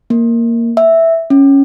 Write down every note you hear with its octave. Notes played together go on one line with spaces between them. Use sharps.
A#3
E5
C#4